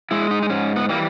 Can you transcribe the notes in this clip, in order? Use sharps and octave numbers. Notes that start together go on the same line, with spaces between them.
G#3 E4
D#4
D#4
G#2 C#4
B3
E3 G3 A#3